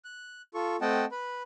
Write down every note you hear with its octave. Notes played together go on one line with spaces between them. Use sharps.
F#6
F4 A4 C#6
A3 C4 D#5 F#5 G5 A5
B4 B5